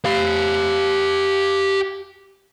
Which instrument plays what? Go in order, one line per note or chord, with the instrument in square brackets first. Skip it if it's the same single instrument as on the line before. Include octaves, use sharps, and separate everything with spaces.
[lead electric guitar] G4 F5